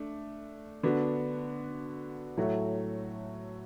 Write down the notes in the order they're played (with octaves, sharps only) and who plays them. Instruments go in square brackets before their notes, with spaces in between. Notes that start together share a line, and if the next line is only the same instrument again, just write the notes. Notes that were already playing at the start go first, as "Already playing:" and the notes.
Already playing: [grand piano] A3 D4
D3 B3 D4 F#4
A2 F#3 A3 F#4